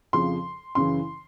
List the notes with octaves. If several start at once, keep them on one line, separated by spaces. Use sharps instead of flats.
F2 C#3 F3 C6
F#2 C#3 E3 C6